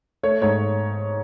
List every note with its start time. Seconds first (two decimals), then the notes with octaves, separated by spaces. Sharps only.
0.23 A3 C#5
0.42 G#2 C#5